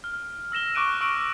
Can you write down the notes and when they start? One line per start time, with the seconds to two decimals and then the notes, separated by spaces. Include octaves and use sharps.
0.04 F6
0.52 E6 A#6 E7 G7
0.75 C#6 D6 F#6 D7 D#7
1.01 C#6 E6 D7